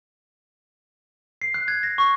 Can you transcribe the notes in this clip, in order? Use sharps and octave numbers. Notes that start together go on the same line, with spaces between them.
C7
F#6
G#6
A#6
C#6